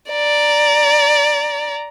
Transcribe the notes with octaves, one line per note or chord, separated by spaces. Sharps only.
D5 A#5